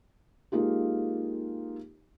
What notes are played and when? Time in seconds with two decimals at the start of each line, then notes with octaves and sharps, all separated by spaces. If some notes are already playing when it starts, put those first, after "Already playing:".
0.52 G#3 A#3 D#4 F4 G4